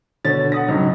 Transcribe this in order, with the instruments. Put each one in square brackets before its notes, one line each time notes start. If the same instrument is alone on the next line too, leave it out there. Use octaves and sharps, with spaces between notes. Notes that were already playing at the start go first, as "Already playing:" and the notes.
[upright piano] B2 D3 C#5 A6
F#5 D#6 A#6
C#2 G#2 F#3